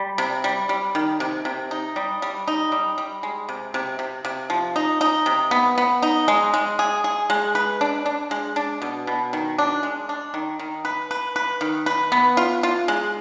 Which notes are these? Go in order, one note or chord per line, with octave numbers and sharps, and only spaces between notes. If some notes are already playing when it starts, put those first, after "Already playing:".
Already playing: G3
C3
G3
G3
D#3
C3
C3
D#4
G3
G3
D#4
G3
G3
G#3
C3
C3
C3
C3
F3
D#4
D#4
C3
B3
B3
D#4
G#3
G#3
G#4
G#4
G#3
B4
D4
D4
G#3
D4
B2
B2
D#3
D4
G#3
D4
D#3
D#3
B4
B4
B4
D#3
B4
B3
F4
F4
G#3